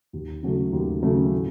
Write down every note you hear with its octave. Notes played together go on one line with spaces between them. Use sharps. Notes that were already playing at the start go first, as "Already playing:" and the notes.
D#2
C#3 F#3 A3
D#2
C#3 F#3 A3
A2